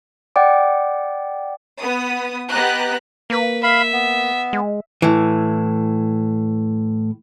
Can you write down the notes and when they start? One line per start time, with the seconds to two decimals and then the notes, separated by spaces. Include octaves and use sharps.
0.36 D5 F#5 G5 D6
1.81 B3 D#6
2.50 B3 G4 D#5 A#5 F#6
3.30 A#3 B4
3.63 E5 F5 B5
3.93 B3
4.53 G#3
5.02 A2 E3